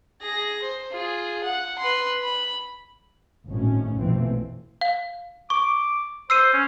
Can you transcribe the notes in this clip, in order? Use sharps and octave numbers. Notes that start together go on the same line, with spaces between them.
G#4 A#6
C5
F4 G#4
F#5
B4 C6
B5
G#1 A2 C#4
A#1 F2 B2 E3 A3 C4
F5
C#6 D6
C5 E6 C7 D#7
C#4